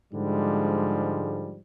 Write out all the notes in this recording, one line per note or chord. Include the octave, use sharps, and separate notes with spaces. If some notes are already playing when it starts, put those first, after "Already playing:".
G#2 D3 F3 G3 G#3